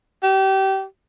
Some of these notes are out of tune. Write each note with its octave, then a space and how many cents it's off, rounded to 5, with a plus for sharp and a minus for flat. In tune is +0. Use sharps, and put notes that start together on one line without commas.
G4 -30